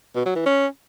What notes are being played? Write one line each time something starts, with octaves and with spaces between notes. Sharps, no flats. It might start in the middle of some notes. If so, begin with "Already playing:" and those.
B2
F#3
E3
C#4